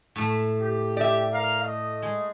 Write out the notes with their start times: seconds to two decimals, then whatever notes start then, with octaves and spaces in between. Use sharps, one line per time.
0.16 A2 A3
0.60 G4
0.97 G4 D5 E5
1.32 A#4 F5
1.63 A3 D#5
2.02 G#3